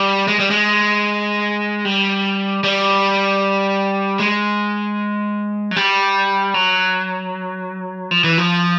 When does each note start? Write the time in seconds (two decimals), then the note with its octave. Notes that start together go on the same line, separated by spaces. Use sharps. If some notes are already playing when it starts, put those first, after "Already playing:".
Already playing: G3
0.28 G#3
0.39 G3
0.51 G#3
1.85 G3
2.64 G3
4.20 G#3
5.71 F#3
5.76 G3
6.54 F#3
8.11 F3
8.24 E3
8.38 F3